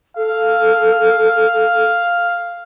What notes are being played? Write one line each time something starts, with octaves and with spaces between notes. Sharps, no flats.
A4 F5